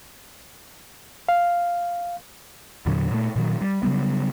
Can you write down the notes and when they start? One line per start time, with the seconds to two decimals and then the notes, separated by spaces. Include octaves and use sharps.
1.29 F5
2.86 E2 A#2 D3 F#3
3.11 A#2 A3
3.36 A#2 D#3 F#3
3.62 G3
3.83 C#3 F#3 G3 B3